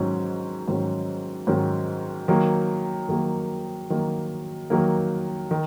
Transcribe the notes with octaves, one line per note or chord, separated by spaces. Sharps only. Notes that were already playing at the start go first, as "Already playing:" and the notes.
Already playing: G#2 D#3 F#3 C#4
G#2 D#3 F#3 C#4
G#2 D#3 F#3 C#4
D#3 F#3 A#3
D#3 F#3 A#3
D#3 F#3 A#3
D#3 F#3 A#3
D#3